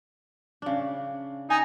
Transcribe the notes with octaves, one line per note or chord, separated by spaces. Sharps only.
C#3 D4
D#4 G#5